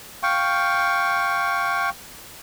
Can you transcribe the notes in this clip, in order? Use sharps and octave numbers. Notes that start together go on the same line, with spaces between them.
F5 G5 C#6